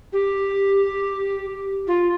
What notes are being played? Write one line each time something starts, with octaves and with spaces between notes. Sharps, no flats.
G4
F4